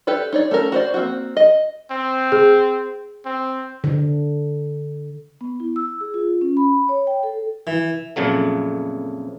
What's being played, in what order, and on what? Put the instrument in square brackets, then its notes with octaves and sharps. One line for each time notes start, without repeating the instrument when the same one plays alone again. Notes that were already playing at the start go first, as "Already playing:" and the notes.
[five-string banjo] G4 A4 B4 D5
D#4 C#5 D5
A3 C#4 A#4
F#4 C5 D5
A#3 C4 F#4
D#5
[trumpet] C4
[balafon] G#4
[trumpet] C4
[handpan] D3
[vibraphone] B3
E4
E6
G#4
F4
C#4
B5
C#5
G5
A4
[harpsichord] E3
[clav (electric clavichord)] F2 A#2 C#3 F#3 A3